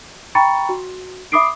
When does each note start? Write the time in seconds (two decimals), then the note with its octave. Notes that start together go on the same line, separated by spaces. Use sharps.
0.35 G5 A#5 B5 C#6 A6 C#7
0.69 F#4
1.32 E5 B5 D6 D#6 C7 D7